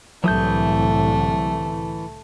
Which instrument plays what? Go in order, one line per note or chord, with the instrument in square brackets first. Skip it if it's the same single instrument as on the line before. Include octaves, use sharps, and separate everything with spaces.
[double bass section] C2 A2 D3 [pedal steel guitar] E3 D#6 G6 [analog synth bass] F#3 [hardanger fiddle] A3